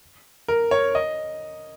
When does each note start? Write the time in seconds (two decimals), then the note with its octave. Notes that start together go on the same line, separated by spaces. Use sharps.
0.48 A#4
0.71 C#5
0.95 D#5